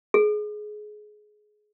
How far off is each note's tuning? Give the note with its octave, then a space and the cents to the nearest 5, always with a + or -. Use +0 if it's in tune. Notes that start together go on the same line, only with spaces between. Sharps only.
G#4 +20